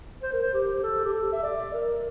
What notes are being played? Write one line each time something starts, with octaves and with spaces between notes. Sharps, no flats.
C5
A#4
C5
G4
A4
G4
A4
E5
D5
A#4